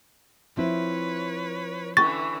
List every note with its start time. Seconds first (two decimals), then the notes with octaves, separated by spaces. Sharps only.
0.57 F3 C4 E4 B4 C#5
1.97 D3 E3 C#4 C#6 A6